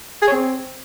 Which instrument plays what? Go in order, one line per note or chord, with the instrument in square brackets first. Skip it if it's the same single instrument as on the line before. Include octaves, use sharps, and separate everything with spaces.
[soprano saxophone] G#4
C#5
C4